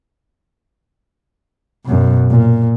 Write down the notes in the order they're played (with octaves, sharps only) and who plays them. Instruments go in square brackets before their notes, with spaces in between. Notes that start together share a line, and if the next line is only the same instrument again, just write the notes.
[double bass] F#2 B2
A#2